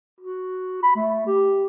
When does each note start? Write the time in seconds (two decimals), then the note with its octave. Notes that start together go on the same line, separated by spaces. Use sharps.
0.20 F#4
0.83 B5
0.96 A3
1.26 G4